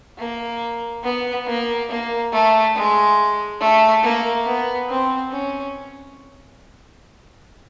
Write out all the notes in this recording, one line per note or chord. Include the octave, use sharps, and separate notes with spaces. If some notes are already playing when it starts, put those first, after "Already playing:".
A#3
B3
A#3
A#3
A3
G#3
A3
A#3
B3
C4
C#4